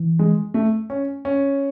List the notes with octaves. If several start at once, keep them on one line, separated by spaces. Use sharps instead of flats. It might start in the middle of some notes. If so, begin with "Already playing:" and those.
Already playing: E3
G#3
A3
C#4
C#4